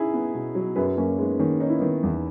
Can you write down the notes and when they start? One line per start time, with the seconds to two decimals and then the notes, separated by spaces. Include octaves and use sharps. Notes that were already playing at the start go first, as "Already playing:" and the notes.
Already playing: C#4 D#4 E4 G#4
0.13 B3
0.35 B2
0.55 F#3
0.76 F#2 G#4 B4
0.97 F#2 A#3 C#4
1.18 G#3 B3 D#4
1.39 D#3 A#3 C#4
1.60 C#4 D#4
1.69 E4
1.79 D#3 B3 D#4
2.03 E2